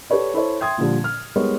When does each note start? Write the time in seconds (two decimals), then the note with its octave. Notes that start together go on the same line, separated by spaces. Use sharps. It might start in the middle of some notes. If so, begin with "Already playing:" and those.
0.10 G4 A4 B4 C#5 D5
0.34 E4 A4 C5 C#5
0.60 E5 G5 C6 D#6 G#6
0.78 A#2 D3 F3 G3
1.04 F6
1.36 G3 G#3 B3 D#4 A#4 C#5